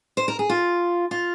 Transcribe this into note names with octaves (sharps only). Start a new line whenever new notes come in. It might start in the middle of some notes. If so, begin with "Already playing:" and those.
C5
A#4
G#4
F4
F4